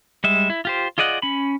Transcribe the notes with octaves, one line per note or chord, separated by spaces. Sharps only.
G3 G#3 E5
E4
F4 G4 C5
F4 G#4 D5 D#5 F#5
C#4 B5